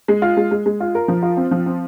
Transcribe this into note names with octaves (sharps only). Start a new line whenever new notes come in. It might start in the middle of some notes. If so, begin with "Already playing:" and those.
G#3
F4
G#3
G#3
G#3
F4
A#4
F3
F4
C4
F3
C4